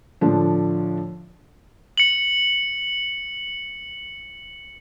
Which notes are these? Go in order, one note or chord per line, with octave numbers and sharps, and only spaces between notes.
A2 D3 F3 D4
C#7 F#7